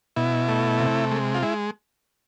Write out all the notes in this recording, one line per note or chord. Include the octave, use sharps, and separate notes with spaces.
B2 E4
A3
C3
G#3
F4
G#3 E4